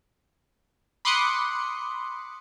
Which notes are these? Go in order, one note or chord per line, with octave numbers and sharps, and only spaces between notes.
B5 C6 D6 D#6 F#6 C#7